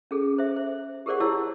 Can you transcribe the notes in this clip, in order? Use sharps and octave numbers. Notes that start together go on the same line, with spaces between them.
C#4 G#4 A4
C5 E5
C5
G4 G#4 A#4 C5 D5 F#5
E4 F#4 G4 C#5 A5 E6